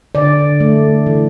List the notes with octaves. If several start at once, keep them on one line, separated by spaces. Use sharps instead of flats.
D3 D5
A3
E3